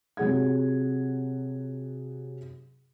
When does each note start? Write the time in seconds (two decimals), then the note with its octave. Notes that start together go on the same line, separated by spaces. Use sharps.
0.17 C3 F#3 G#4 F#5 G#6